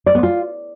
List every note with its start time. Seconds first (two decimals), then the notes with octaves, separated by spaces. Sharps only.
0.06 D5
0.15 B3
0.23 F4